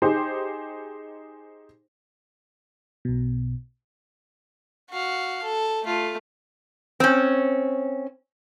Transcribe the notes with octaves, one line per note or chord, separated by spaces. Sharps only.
D#4 G4 G#4 C5
B1 B2
F#4 F5
A4
A3 F4
C4 C#4